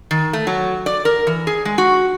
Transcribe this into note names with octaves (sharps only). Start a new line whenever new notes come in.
D#3
A3
F#3
D5
A#4
E3
G#4
G#3
F#4